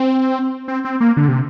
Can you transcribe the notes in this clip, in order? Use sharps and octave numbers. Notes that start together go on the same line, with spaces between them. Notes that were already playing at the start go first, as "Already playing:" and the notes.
Already playing: C4
C4
C4
A#3
D3
C3